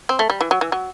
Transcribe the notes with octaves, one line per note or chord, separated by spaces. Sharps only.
C4
A3
G3
E3
F#3
E3
F#3